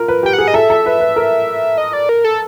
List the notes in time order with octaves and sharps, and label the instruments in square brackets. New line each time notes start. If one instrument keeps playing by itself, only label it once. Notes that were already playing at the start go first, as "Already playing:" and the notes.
Already playing: [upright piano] F4 A#4
B4
[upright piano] G4 [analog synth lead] G5
[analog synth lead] F#5
[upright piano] G#4
[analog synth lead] D#5
[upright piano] A4 [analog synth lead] E5
[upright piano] A4
B4
B4
A#4
[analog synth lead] D#5
D5
A#4
A4